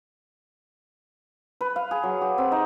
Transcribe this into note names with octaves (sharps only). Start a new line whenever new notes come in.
B4
F5
G#4
F#3
G4
C4
D#4